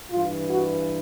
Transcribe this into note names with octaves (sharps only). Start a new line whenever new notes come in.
G2 E3 F4
F#4